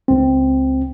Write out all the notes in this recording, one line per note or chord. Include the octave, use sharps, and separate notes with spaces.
C#2 C4